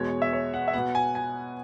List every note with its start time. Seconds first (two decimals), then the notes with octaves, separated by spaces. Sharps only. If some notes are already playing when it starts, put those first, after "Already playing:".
Already playing: E2 B2 G#3 C#5
0.22 E5
0.33 C#5
0.54 F#5
0.68 E5
0.73 B2 B3 F#5
0.95 G#5
1.15 G#5